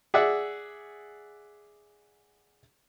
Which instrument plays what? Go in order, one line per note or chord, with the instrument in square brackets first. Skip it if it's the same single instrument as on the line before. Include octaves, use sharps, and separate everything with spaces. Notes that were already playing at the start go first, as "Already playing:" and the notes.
[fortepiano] G#4 D5 E5 F#5